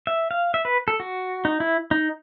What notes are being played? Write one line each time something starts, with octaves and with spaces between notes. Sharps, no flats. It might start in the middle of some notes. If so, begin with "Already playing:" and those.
E5
F5
E5
B4
A4
F#4
D#4
E4
D#4